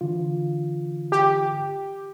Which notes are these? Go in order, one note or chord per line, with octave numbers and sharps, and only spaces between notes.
D3 E3 F4
G4